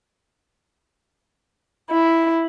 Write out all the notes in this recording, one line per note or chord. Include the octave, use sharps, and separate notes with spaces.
E4